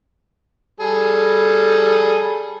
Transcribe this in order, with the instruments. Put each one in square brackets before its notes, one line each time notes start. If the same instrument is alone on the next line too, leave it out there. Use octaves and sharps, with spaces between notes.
[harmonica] G3 G#4 A4